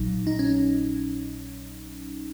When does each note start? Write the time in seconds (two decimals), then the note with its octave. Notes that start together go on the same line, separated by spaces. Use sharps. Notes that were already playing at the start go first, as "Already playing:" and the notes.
Already playing: A#1 A#2 F#3 D#4
0.27 D#4
0.39 C#4